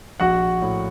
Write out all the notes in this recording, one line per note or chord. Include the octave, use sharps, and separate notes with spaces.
A#1 F#4 F#5
A2